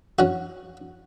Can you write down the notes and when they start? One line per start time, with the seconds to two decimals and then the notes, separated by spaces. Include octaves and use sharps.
0.19 C#4 F#4